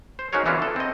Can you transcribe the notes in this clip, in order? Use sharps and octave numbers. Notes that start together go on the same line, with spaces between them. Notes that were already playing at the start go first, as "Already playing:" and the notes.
C5
C#4 D#4 F#4 G#4 A#4 C#5
E3 B3 C#4 D4 E4 F4
A4
C4 D#5